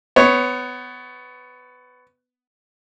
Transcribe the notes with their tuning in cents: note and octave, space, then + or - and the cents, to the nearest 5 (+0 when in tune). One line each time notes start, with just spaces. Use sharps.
B3 +20 C#5 +0